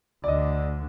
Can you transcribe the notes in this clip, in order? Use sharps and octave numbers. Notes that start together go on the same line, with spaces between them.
D2 D3 D5 D#5